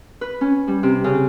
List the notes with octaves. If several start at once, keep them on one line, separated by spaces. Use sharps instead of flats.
B4
C#4
G3
C3
C#3